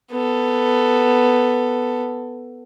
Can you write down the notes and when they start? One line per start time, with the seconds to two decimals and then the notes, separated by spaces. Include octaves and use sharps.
0.12 B3 A4